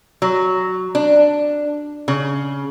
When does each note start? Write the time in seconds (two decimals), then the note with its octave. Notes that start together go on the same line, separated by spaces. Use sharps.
0.22 F#3
0.95 D4
2.08 C#3